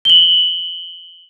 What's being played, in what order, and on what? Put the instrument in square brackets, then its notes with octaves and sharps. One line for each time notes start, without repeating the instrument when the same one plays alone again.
[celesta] F#7 G7